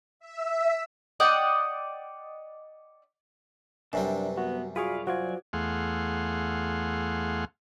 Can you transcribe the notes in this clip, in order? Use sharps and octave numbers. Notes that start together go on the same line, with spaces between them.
E5
D5 D#5 F#5 G5
F#2 C3 G3 D4 B4
B3 F#4
F4 F#4 G#4 B4 D5 F5 C#6
F#3 F4 F#4 C5 D5 G#5
E2 A3 G#4 F5 F#5 C6